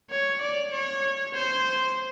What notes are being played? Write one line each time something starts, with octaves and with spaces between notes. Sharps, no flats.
C#5
D5
C#5
C5